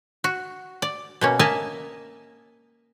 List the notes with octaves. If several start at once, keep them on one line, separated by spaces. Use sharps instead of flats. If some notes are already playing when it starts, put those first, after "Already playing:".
F#4
D5
B2 A#3 C#4
A#3 A#4 D#5 E5 G#5 A5